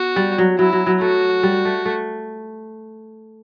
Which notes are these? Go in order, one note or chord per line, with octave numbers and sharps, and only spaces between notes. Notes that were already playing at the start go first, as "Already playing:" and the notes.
Already playing: B3 F#4
G3
F#3
F#3 E4
F#3
F#3
A3 F#4
G3
A3
A3